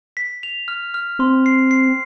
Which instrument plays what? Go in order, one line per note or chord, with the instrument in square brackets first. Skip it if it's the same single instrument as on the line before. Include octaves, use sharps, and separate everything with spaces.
[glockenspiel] B6
F7
F6
F6
[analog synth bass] C4 [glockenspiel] C6
[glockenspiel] C7
C7